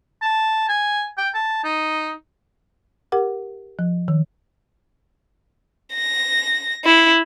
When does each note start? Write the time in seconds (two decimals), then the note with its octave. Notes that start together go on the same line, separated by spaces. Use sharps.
0.22 A5
0.69 G#5
1.17 G5
1.34 A5
1.64 D#4
3.12 G4 A#4 F#5 D6
3.79 F3
4.08 D#3
5.94 A#6
6.84 E4